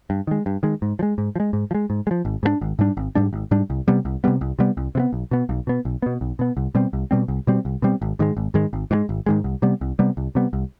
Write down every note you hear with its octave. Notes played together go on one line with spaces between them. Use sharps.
G2
D#3 G#3
G2
D#3 G#3
G#2
F3
G#3
G#2
F3
G#3
G#2
F3
G#3
G#2
G#3
F3
G#1
G#2 G3 D4
G#1
G#2 G3 D4
G#1
G#2 G3 D4
G#1
G#2 G3 D4
C2
C3 G3 B3
C2
C3 G3 B3
C2
C3 G3 B3
C2
C3 G3 B3
B1
B2 B3
B1
B2 B3
B1
B2 B3
B1
B2 B3
C2
B2 G3 C4
C2
B2 G3 C4
C2
B2 G3 C4
C2
B2 G3 C4
G#1
G#2 D#3 G#3
G#1
G#2 D#3 G#3
G#1
G#2 D#3 G#3
G#1
G#2 D#3 G#3
C2
C3 G3 B3
C2
C3 G3 B3
C2
C3 G3 B3
C2